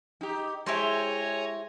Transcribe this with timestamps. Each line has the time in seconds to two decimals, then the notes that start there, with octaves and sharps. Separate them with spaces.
0.21 D#4 G4
0.66 G#3 E4 G4 C5 C#5 G#5 A#5